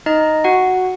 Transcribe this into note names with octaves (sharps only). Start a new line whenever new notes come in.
D#4 D#5
F#4 F#5